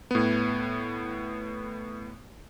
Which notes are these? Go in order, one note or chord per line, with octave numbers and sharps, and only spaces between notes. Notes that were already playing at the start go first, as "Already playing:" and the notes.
A2 B3